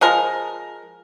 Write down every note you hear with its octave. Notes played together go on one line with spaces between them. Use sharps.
F3 G#3 A#4